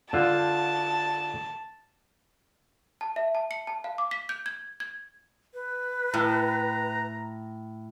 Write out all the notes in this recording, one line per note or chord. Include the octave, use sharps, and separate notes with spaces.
D3 F4 A5
A5
E5
A5
C#7
A5
F5
D6
B6
G6
G#6
G#6
B4
A2 A#5